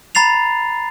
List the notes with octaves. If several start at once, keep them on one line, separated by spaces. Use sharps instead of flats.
A#5 B5 A6 C7 F7